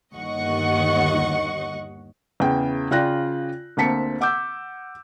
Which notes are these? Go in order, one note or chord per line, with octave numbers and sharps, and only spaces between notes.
G1 D#2 D#5 F#5 C#6
E2 C#3 G5
C#3 F4 D5 G5 F#6 A#6
D2 A#3 C4 A5 B6 C#7
F#5 D6 E6 G6